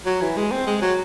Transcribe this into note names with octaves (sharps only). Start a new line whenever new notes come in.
F#3
E3
G#3
C4
G#3
F#3